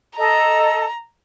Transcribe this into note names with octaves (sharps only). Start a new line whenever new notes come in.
A4 D#5 A#5